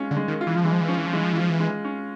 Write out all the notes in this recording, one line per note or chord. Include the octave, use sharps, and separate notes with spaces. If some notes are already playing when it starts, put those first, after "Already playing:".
Already playing: G#3 C#4 F4
D3
G#3
D#3
F4
E3
F3
E3 G#3
F3
E3
F3 C#4
E3
F3
E3 G#3
F3
E3
F3 F4
E3
G#3
C#4